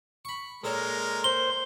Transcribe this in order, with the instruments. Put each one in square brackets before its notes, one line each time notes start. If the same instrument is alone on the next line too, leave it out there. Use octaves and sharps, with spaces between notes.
[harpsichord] B5 C#6
[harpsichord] A#2 A4 C#5 [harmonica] G#3 A#4
[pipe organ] C5 [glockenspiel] G7